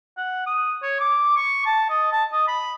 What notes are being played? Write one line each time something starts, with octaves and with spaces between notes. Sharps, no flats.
F#5
D#6
C#5
D6
C#6
A5
D#5
A5
D#5
B5